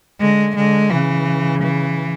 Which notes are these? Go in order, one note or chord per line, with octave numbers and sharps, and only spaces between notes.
D3 G#3
D3 G#3
C#3 E3
E3